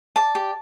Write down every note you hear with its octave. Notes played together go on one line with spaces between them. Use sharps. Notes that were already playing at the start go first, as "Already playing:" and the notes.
D5 A5
G4